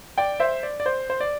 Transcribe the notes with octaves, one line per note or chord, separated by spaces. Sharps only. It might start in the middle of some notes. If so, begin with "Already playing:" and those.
D5 G5
C5 E5
D5
D5
C5
C5
D5